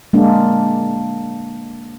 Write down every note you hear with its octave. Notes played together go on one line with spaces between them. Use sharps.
G#3 A#3 D4